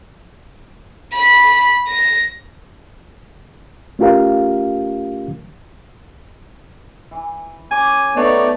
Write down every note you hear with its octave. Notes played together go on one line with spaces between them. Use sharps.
B5
A#6
A3 C#4 F4 G4 A#4 F5
E3
C#3 G#5 D6
A3 B3 D#4 C#5 D5